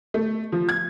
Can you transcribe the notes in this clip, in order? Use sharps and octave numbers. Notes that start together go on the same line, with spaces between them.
A3
F3
G#6